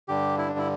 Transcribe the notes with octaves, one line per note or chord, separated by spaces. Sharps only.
G2 D3 G4
E4
D4
E4